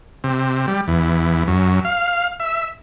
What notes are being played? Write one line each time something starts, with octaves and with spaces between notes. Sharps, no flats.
C3
G3
E2
F#2
F5
E5